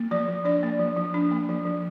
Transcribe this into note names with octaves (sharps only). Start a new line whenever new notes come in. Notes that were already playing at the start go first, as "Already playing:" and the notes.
Already playing: A#3
F3 D5
F3
D4 D5
A#3
F3
F3
D4
A#3
F3
F3